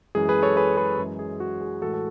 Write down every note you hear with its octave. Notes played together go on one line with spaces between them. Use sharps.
F#2 E3 G#3 G#4
G#4 B4
A4 C#5
G#4 B4
G#4 B4
F#2 E3 G#3
G#4
F#4
G#4
A2 E3 G#3 F#4 A4
A4